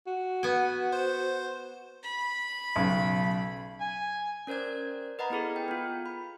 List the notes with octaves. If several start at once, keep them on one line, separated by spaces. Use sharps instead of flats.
F#4
B3 G#5
C5
B5
B1 C#3
G#5
C#4 A#4 C5 D5 G#6
B4 D#5 F#5 A#5 B5
B3 E4 G#4 A4
G5
B3 F4
B5